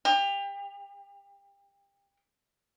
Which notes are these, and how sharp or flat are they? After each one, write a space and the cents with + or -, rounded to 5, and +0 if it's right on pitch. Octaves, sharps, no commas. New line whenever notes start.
G4 +30